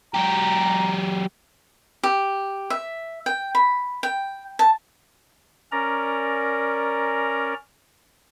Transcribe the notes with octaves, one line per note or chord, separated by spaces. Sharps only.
F#3 G4 A#5
G4
E5
G5
B5
G5
A5
C#4 A#4 D5 A#5